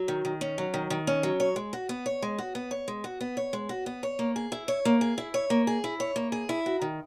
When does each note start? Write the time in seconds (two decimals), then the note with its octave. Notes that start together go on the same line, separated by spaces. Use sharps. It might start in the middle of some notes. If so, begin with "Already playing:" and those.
Already playing: F#3
0.08 D#3
0.25 D#3
0.41 C#4
0.58 F#3
0.74 D#3
0.90 D#3
1.07 C#4
1.23 F#3
1.40 C#5
1.56 G#3
1.73 F#4
1.89 B3
2.06 C#5
2.22 G#3
2.38 F#4
2.55 B3
2.71 C#5
2.88 G#3
3.04 F#4
3.21 B3
3.37 C#5
3.53 G#3
3.69 F#4
3.86 B3
4.03 C#5
4.19 A#3
4.36 G#4
4.52 E4
4.68 C#5
4.85 A#3
5.01 G#4
5.18 E4
5.34 C#5
5.50 A#3
5.67 G#4
5.84 E4
6.00 C#5
6.16 A#3
6.32 G#4
6.49 E4
6.66 F#4
6.81 D#3